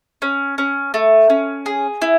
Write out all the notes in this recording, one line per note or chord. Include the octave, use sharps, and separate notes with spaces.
C#4
C#4
A3
C#4
G#4
E4